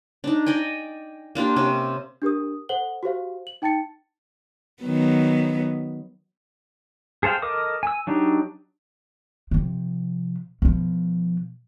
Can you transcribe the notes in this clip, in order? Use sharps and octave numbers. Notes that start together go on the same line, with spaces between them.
D4 D#4
D5 D#5 G5 G#5
A#3 D4 F4 G4
C3 C#4 G4
D4 G4 A#4 D#6
A4 C5 F#5 F#7 G7
F#4 G4 C5 F5
F#7
D#4 G5 A5 A6 C#7
D#3 F#3 B3
G#4 A4 C5 F5 G5
A4 A#4 D#5 D6 D#6
G#5 E6
F#3 D4 D#4 G4
C3 F3
B2 F3